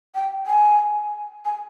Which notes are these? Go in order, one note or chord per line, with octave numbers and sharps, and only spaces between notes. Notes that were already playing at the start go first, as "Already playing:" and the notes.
G5
G#5
G#5